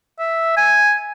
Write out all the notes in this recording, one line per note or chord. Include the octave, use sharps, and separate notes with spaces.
E5
G#5